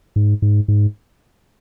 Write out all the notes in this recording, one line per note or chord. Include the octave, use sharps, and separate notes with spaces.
G#2
G#2
G#2